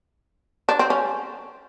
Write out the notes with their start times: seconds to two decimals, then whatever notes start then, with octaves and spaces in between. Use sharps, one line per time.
0.69 D4
0.79 C4
0.90 C#4